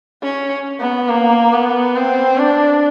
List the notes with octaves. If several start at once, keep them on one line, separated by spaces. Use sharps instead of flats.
C#4
B3
A#3
B3
C4
D4